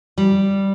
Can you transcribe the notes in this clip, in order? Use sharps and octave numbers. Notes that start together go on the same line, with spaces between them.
G3